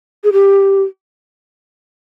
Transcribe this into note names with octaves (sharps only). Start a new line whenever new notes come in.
G#4
G4